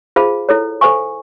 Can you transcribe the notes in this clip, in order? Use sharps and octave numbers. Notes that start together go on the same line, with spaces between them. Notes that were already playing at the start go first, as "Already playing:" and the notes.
F4 G#4 C5 F5 A5
E4 A4 C#5
A4 C5 F5 G#5 C#6